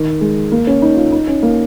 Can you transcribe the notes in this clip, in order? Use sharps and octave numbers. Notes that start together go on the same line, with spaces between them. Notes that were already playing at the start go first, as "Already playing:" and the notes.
Already playing: D#3
G#3
A#3
C#4
D#4
F4
D#4
C#4
A#3